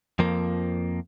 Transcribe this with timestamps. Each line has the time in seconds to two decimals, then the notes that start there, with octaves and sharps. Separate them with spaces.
0.19 F2 F3 A#3